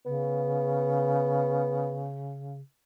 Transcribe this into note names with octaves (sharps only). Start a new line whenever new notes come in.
C#3 B3